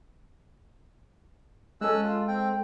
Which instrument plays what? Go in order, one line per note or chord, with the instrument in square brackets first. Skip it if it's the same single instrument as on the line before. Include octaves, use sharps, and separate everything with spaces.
[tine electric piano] G#3 A4 [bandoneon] C#4 E6 F#6
[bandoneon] F4
C4 G5